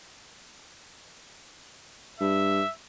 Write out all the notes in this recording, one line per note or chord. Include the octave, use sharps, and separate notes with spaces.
G2 E5